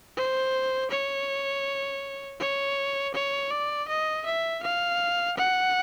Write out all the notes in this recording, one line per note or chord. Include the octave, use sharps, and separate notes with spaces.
C5
C#5
C#5
C#5
D5
D#5
E5
F5
F#5